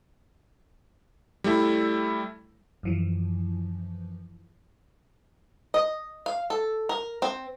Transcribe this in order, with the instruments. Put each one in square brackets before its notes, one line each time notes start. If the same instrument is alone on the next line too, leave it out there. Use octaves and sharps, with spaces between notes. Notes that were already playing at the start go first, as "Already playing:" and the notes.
[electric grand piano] G3 A3 E4
[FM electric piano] F#2 E3 F3
[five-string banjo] D#5
F5
A4
A#4
C4